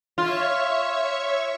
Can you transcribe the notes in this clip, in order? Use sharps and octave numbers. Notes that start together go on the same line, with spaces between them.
F4 C#5 E5 C#6